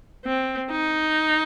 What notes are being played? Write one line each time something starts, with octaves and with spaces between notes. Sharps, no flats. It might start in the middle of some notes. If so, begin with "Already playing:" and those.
C4
D#4